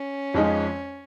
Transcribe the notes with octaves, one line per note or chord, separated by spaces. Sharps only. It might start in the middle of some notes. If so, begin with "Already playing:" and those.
Already playing: C#4
F2 F3 G#3 D#4